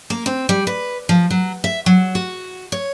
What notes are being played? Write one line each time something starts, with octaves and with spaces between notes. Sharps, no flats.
A#3
C4
G3
B4
F3
F#3
E5
F#3
F#4
C#5